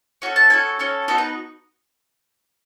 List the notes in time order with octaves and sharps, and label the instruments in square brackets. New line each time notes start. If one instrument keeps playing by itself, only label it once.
[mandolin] C#4 F#4 A4
A5
C#4 F#4 A4 G#5
C#4 F#4 A4
B3 D#4 F#4 A4
B4